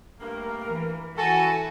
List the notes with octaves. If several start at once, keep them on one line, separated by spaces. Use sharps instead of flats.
G2 A3 A#3 A#4
E3
E3 E4 F#4 A4 G#5